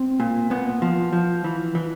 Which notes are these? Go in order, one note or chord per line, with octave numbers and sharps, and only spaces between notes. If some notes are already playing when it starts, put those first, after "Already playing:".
Already playing: C4
A#2
A#2 B3
F3
F3
E3
E3